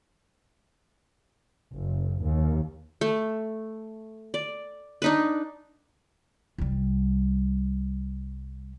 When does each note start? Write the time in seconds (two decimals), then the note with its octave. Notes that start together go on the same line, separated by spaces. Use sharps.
1.71 F#1
2.21 D#2
3.01 A3
4.34 D5
5.02 D4 D#4 B4
6.58 C2 G3